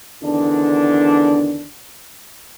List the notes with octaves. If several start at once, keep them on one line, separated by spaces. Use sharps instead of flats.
E2 D3 D#3 D4